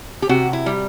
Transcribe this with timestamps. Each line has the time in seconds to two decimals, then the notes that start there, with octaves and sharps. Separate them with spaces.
0.22 G4
0.29 C3 F#4
0.53 E4
0.66 G3